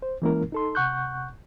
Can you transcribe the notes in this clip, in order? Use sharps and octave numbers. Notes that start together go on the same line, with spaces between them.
C5
E3 G#3 A#3 C#4 E4 A#4
D#4 A4 C6
C3 F#5 C#6 F#6 G6